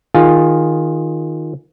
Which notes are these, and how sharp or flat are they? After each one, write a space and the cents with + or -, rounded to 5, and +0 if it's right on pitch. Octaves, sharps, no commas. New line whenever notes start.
D#3 +0 F4 +5 G#4 -10